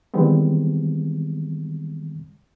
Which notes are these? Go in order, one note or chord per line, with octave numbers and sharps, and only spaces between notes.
D#3 E3 G3 G#3 B3 C4